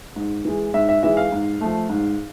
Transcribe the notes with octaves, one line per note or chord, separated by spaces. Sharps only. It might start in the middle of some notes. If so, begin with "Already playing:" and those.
G#2
E3 G#3
G#2 E5
E5
E3 G#3 E5
F5
G#2
F3 A3
G#2